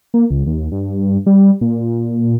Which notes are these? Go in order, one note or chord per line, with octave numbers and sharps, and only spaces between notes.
A#3
C#2
D#2
G2
G3
A#2